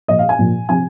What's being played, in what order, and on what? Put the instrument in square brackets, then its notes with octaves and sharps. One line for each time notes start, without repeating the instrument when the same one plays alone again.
[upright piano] A#2 F3 D#5
F5
G#5
A#2 F3
C3 F3 G#5